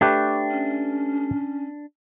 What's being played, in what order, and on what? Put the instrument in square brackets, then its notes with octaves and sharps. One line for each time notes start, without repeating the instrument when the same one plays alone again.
[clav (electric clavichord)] A3 G4 B4 [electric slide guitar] D4
[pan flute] C#4